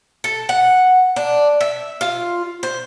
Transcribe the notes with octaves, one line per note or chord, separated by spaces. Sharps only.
A4
F#5
D4
E5
F4
C5